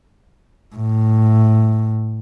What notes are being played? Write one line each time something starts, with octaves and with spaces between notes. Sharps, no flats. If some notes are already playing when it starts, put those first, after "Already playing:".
A2